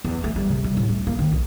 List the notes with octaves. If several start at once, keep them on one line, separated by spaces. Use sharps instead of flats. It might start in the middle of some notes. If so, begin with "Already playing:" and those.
E2
A3
G3
C3
G3
A2
A3
A#3
D#3
B1